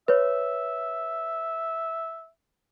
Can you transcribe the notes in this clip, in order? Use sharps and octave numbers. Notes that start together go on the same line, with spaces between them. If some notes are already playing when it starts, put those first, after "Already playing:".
B4 C#5 E5